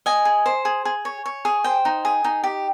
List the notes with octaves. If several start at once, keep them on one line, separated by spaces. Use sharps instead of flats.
D#5 G#5
G#4
C5
G#4
G#4
C#5
C#5
G#4
C5 G5
D#4
G#4
D#4
G4